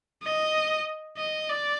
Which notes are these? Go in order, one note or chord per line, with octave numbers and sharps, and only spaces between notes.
D#5
D#5
D5